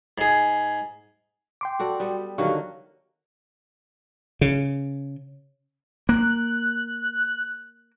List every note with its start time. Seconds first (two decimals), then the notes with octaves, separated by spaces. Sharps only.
0.18 G#2 G#4
1.61 G5 C6 D6
1.80 F#4 A4 D5
2.00 G3 B3 A4
2.38 D3 D#3 F#3 G4 F5 C#6
4.41 C#3
6.09 A#3 F#6